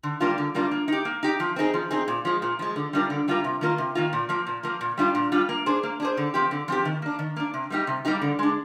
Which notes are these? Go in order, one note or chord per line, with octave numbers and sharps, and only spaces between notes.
D3
G3 A#3 D4 F4
D3
G3 A#3 D4 F4
A#3
D#4 G4
A#3
D#4 G4
F3
C4 D#4 G#4
F3
C4 D#4 G#4
A#2
F3 G#3
A#2
F3 G#3
D3
G3 D4 F4 A#4
D3
G3 D4 F4 A#4
C3
D#3 A#3 F4 A#4
C3
D#3 A#3 F4 A#4
A#2
F3 A#3
A#2
F3 A#3
A#2
G3 D4 F4
A#2
G3 D4 F4
A#3
D4 G#4 C5
A#3
D4 G#4 C5
D3
F3 C4 G4
D3
F3 C4 G4
D#3
A#3 D4
D#3
A#3 D4
C3
G3 A#3 D#4 G4
C3
G3 A#3 D#4 G4
D3
G#3 D4